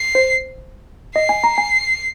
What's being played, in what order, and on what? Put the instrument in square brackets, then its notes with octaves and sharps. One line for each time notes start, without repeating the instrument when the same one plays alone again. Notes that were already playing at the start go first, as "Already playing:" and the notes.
Already playing: [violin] C7
[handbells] C5
[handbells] D#5 [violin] C7
[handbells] G#5
A#5
G#5